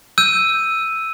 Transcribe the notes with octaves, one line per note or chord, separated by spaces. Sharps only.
E6 G6 D#7